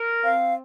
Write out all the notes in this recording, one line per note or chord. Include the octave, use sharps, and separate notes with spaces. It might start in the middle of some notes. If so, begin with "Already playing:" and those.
Already playing: A#4
C4 F5